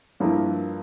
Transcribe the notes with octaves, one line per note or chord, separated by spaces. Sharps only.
G2 F3 A#3 E4 A#4